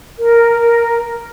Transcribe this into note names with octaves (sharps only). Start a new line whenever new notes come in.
A#4